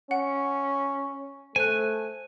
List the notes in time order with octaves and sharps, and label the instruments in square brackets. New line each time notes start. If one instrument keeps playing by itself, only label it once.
[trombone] C#4 [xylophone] F#5
[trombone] A3 [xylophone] C5 F#6 [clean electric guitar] G#5